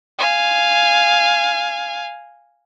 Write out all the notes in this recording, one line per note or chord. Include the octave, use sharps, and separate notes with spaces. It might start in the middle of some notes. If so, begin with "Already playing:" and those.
F5 G#5